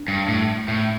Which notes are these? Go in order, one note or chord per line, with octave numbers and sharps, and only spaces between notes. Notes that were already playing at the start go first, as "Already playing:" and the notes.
Already playing: D4
G2
A2
A2